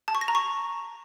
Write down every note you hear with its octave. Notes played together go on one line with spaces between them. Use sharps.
A5
C#6
A#6
A#5
C#6